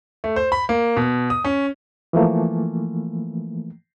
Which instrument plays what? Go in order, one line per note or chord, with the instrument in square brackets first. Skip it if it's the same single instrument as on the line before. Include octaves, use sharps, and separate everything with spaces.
[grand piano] A3
C5
B5
A#3
B2
D#6
C#4
[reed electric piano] E3 F3 A3 A#3